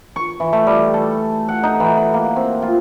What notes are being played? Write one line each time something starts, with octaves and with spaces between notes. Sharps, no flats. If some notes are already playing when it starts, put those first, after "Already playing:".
C#6
E3
A3
G3
A4
F#5
D#4
E3
B4
A#3
C4
F4